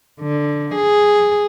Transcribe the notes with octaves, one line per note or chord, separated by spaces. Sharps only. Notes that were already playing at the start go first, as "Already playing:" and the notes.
D3
G#4